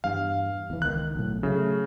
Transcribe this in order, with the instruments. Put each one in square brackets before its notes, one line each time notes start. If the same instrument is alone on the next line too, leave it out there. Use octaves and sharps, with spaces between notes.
[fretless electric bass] E2 G2 [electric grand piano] F5
[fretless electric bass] E2 E3
[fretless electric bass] C#2 D#3 [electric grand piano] F#6
[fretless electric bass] B1 A2
[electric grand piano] C#3 [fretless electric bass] F#3 A3